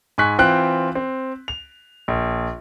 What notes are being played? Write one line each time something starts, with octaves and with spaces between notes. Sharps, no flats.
G#2 G#5 C#6 F#6 B6
E3 C4 F4 G5 F#6
C4
F7
A#1